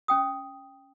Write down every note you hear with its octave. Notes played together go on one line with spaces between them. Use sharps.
C#4 G5 D#6